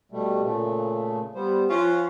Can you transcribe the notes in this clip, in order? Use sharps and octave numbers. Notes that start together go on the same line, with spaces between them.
B2 G3 A3
A#2 C#3 A3
G3 B3 C5
F3 C#4 F4 F#5